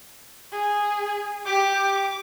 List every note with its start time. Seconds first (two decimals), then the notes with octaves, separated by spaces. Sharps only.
0.52 G#4
1.46 G4 D6